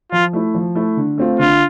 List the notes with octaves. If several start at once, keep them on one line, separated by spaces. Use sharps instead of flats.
F3 F4
A3 E4
F3
A3 E4
D3
A3 C4 F4
D3 F4